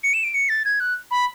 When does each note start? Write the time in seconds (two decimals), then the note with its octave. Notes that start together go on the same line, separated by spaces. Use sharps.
0.04 C#7
0.14 E7
0.24 D7
0.34 C#7
0.49 A6
0.65 G#6
0.80 F#6
1.11 B5